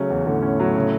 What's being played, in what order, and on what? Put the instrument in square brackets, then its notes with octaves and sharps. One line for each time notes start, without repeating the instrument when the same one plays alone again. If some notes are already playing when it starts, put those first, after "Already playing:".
Already playing: [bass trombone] C#3 [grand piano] F#3 A3 C#4
[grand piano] E2
[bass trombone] A2 [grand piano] D3
[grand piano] C#4
F#3
C#3